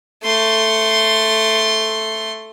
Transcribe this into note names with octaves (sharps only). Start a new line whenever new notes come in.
A3 C6